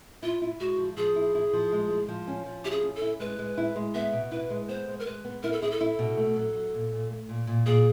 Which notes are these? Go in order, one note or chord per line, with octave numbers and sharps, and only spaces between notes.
E4 F4
E4
G#3 F#4
F3
F3 G#4
E4
E4
F3
G#3
G#3
F3
C#4
F3
E4 G4
G#4
C#4
A4
E4
G#3 B4
G#3
E4
G#3
B3 E5
B2
E4 B4
G#3
B3 C5
G#3
A#4
G#3 B4
B3
E4 A#4
A4
E4 G#4
A4
E4
B2
A3
F#3
F#3
A#2
A#2
A3
A#2
A#2
A#2 G#4